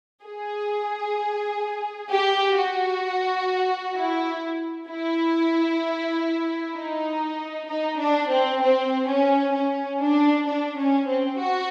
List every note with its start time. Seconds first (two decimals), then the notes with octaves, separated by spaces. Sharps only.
0.24 G#4
2.11 G4
2.57 F#4
3.96 E4
4.89 E4
6.76 D#4
7.68 D#4
7.99 D4
8.30 C4
8.62 C4
9.08 C#4
9.54 C#4
10.01 D4
10.48 D4
10.78 C#4
11.09 C4
11.40 F#4